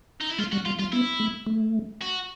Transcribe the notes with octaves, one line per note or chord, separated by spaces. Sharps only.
D#4
E4
G#3 F4
G3 F#4
G3 F4
G3 F4
B3 E4
A3
A3
F#4